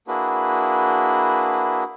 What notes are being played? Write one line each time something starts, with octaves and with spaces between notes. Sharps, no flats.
A#3 D4 E4 F#4 G#4 B4